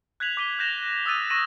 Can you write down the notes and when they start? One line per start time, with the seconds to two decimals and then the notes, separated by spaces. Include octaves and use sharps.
0.20 F#6 G#6 B6 F7 F#7
0.37 D6 F#6 B6 D#7 F7 G7
0.59 F#6 G6 A#6 E7 F7
1.06 D#6 E6 F#6 A6 D#7
1.30 C#6 A#6 D#7 E7 F#7